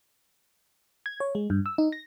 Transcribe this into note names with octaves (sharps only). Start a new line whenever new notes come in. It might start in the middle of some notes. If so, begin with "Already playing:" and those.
G#6
C#5
G#3
G2
E6
D#4
A#6